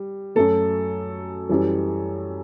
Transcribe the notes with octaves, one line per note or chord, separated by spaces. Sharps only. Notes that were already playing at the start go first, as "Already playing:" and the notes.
Already playing: G3
F#2 F#3 A3 A4
F#2 E3 G3